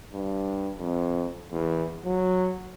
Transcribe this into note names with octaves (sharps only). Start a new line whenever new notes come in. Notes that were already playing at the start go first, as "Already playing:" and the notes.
G2
F2
E2
F#3